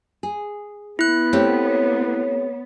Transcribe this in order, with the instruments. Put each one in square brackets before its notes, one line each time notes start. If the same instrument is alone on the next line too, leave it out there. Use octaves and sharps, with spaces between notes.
[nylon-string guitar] G#4
[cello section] B3 [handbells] E4 F#6
[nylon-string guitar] A3 C4 G4 [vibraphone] C#5